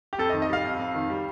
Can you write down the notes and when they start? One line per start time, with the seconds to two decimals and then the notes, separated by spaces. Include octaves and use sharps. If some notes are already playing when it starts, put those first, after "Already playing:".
0.13 G4
0.18 F2 A4
0.30 D#5
0.33 D#3
0.42 D#5
0.49 G3 F5
0.64 F2
0.79 F2
0.95 D#3
1.10 G3